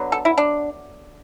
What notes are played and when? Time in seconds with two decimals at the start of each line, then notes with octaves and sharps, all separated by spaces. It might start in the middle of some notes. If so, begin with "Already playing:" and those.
Already playing: D3 F#3 B3
0.12 A4
0.25 E4
0.38 D4